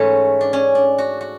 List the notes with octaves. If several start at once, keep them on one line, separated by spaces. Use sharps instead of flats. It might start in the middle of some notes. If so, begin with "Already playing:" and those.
Already playing: G#2 E3 A3 C#4
D4
C#4
D4
F#4
F#4